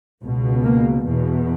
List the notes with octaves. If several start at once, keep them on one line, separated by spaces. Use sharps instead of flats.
C#2 B2
A#3
E2 B2